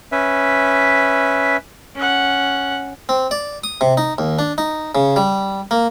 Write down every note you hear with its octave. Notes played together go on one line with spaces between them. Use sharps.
C#4 B4 E5
C#4 F#5
C4
D5
D#6
C3
D#4
D#2
D4
D#4
C#3
G3
A#3